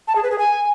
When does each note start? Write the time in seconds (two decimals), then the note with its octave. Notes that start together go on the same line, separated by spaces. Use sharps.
0.08 A5
0.15 G#4
0.23 B4
0.31 G#4
0.39 G#5